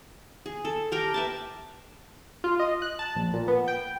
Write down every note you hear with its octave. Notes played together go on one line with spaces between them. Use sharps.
G#4
A4
G4 A#4 G5
B4 E5 A5
F4
D#5
F#6
A5
A#1
A#2
B3
G5